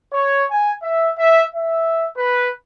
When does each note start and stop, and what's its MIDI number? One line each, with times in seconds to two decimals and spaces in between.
0.12 0.44 73
0.50 0.71 80
0.83 1.09 76
1.17 1.42 76
1.54 2.07 76
2.17 2.49 71